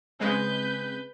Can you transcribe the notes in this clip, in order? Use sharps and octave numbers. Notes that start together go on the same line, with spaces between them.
C#3 G#3 C4 B4 G6